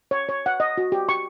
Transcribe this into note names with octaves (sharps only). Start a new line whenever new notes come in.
C#5
C#5
F#5
D#5
F#4
G4
C#6